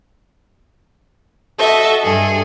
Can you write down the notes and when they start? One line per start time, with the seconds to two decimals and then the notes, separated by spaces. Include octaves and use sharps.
1.59 F#4 A4 D#5 E5
2.03 G2 G#4 A4